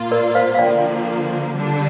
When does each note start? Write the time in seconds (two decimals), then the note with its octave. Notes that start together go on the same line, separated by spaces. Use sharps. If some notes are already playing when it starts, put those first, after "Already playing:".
Already playing: A#2 A#3 F4
0.11 A#4 D5
0.35 C5 F5
0.55 F5
0.59 D3 F3 A#3 D5 G5
1.54 D3 G3 D4